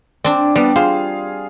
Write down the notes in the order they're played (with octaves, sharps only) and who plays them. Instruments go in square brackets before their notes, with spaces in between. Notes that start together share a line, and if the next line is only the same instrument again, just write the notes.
[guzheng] C4 D4 [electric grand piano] D5
[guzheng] G3 [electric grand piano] B3 D4 D5
[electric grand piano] F4 G#4 F5 [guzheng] C5